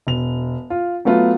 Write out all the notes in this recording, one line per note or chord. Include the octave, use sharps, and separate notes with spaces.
E1 F7
F4
F#3 A3 B3 F4